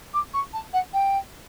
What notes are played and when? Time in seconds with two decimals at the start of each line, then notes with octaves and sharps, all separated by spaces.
0.14 D6
0.34 C#6
0.53 A5
0.73 F#5
0.93 G5